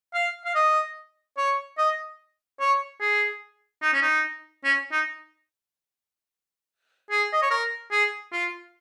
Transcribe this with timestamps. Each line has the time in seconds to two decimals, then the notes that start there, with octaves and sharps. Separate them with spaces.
0.14 F5
0.45 F5
0.55 D#5
1.37 C#5
1.78 D#5
2.60 C#5
3.00 G#4
3.82 D#4
3.93 C#4
4.02 D#4
4.64 C#4
4.92 D#4
7.11 G#4
7.33 D#5
7.42 C#5
7.51 A#4
7.91 G#4
8.32 F4